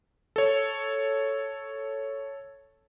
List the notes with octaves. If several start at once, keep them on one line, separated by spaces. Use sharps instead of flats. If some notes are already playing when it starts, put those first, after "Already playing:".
A4 C#5